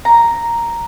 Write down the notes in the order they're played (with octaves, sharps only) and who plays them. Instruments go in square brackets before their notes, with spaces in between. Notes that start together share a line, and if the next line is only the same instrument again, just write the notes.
[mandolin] A#5